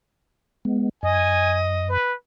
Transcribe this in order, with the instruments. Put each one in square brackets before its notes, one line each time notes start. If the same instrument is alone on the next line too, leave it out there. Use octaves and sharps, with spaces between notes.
[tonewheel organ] G#3 B3
[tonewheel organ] F#2 [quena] D#5 [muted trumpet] G#5
[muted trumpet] B4